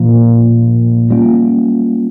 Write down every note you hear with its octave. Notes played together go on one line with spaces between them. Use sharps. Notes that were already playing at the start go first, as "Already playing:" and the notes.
Already playing: A#2 F3 A#3
G3 A#3 C#4 F4